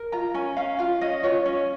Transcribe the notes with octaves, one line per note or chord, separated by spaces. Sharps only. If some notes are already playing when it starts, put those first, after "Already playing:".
Already playing: A#4
F4 A#5
C#4 G#5
C#4 F5
F4 F5
C#4 D#5
F4 C#5
C#4